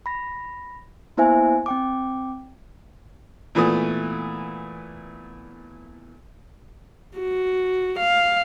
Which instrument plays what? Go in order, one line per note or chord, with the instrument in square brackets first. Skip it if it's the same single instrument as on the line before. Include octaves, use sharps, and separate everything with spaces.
[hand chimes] B5 A#6
A#3 B3 E4 C5 E5 G#5
C4 G5 D6
[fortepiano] A#2 E3 A3 B3 D#6
[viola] F#4
F5